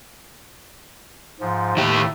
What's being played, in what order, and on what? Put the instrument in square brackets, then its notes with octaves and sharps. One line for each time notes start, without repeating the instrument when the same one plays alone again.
[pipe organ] G#2 F3
[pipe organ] A2 A3 [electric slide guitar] D#3 G4